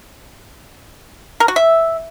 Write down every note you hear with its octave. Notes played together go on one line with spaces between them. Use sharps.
A#4
F#4
E5